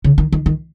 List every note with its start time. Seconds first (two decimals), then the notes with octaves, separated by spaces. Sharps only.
0.04 C#3
0.18 D#3
0.33 D#3
0.46 D#3